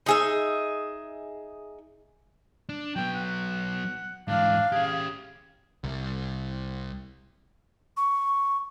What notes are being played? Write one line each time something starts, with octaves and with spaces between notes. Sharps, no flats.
D#4 G#4 E5
D4
F#3 B3 G5
F#5
G#2 E3 D4 F5
C#4 G4 G#4
C2
C#6